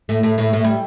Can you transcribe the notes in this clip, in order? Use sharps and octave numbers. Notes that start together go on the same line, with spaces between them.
A2 A3
A2 A3
A2 A3
A2 A3
G3